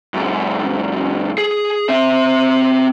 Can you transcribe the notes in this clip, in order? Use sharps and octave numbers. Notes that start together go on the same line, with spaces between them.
C#2 F#2
G#4
C4 E5